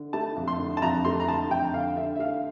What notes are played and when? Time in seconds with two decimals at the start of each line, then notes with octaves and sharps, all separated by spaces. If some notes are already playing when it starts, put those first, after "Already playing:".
Already playing: D3
0.13 A3 A5
0.36 F2
0.48 C6
0.59 D3
0.77 A5
0.82 F2 A#5
1.05 A3 C6
1.20 A#5
1.28 D3 A5
1.50 F2 G5
1.74 D3 F5
1.97 D3 E5
2.15 E5
2.19 A3 F5